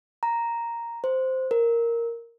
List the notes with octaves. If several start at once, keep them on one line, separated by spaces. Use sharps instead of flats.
A#5
C5
A#4